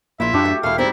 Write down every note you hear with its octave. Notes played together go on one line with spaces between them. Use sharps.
A#1 A#2 E4 F4 E5
F#2 D4 F#4 G4 A5
A3
E1 A3 E4 F5
G#2 G3 C4 E4